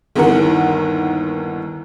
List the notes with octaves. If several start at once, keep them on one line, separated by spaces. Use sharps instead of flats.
G1 D#2 D#3 E3 A#4 F#5